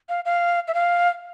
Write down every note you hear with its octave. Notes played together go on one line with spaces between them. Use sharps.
F5
F5
E5
F5